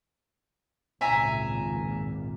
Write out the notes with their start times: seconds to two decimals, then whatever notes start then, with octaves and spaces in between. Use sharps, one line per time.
1.01 G#1 C#2 A#2 E5 G#5 A#5